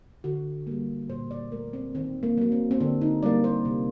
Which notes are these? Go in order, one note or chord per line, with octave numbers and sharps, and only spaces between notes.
D3 F#4
G3 A#3
A#2 C5
D5
A3 A#4
C4
D#3 C4
A#3
F#3 A#3
C4
C4
D3 D4
D#4
G3 A#3 D5
C5
C3